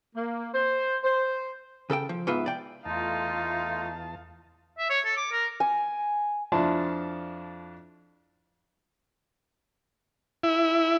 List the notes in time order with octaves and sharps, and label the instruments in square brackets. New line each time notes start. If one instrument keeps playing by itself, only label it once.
[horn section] A#3
C5
C5
[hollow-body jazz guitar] C#3 A4 D5 G5
F3
G#2 B3 F4 B4 E5
D5 G5
[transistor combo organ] E2 A5 [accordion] A3 F4 [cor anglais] D#4 [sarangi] F5
[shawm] E5
C#5
A4
D6
A#4
[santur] G#5
[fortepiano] F2 F3 D4 E4 A5 C6
[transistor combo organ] E4